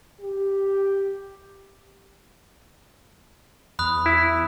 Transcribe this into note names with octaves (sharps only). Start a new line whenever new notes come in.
G4
E2 B5 D#6 F#6
E4